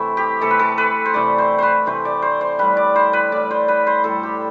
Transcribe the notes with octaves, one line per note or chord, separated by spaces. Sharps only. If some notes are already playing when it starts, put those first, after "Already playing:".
Already playing: C3 E3 A3 E4
G4
C3 E3 A3 A4
B4
A4
B4
C5
C3 E3 A3 D5
C5
B4 C5
C3 E3 A3 C5
D5
C5
C5
A2 G3 B4
D5
C5
B4
A2 G3 D5
C5
B4
C5
A2 G3 A4
G4